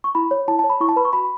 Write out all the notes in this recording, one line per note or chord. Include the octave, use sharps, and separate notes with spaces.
C#6
E4 B5
C#5
E4 A5
A5
C#5
B5
E4 C#6
A5
B4 B5
C#6
F#4 B5